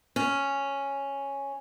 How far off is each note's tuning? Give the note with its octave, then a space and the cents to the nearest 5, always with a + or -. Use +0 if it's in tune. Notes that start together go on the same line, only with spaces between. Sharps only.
C#4 +0